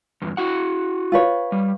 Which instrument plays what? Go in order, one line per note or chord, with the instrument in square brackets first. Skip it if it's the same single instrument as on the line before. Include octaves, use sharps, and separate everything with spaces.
[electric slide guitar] E2 G2
E4 F#4 F#5
[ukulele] F4 B4 C#5
[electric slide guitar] G3